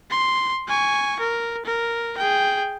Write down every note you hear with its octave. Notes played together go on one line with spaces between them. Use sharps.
C6
G#5 C#6
A#4
A#4
G#4 G5